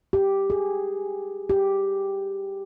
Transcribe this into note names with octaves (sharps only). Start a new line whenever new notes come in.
G4
G#4
G4